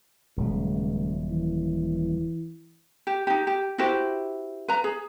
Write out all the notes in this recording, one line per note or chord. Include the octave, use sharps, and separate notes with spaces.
D#1 C#2 F#3
E3
G4
D#4 G4
G4
E4 F#4 G4 C5
B4 A#5
G#4